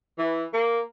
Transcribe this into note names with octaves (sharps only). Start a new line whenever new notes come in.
E3
A#3